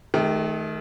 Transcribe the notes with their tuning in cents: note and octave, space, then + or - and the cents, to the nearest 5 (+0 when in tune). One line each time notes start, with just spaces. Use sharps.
D#3 +0 A3 -35 G4 +30